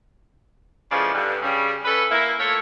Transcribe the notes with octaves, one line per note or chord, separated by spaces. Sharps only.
A2 C#3 F3 G#3 B3 D5
G2 D3
C#3 G3
C#4 A4 B4
A#3 E4
F3 A3 A#3 A4 C#5